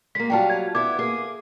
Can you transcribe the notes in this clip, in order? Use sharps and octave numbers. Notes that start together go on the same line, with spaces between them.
G#3 A#3 B6
F#3 G3 F4 G5 A5
G#6
B3 E4 D6 G#6
A#3 G#4